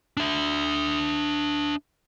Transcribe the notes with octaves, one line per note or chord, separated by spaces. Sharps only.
D4 E5